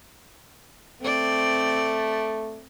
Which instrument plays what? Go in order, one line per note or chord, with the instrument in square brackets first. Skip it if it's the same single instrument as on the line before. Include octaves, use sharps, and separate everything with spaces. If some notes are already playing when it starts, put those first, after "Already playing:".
[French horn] A3 [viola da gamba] C4 D5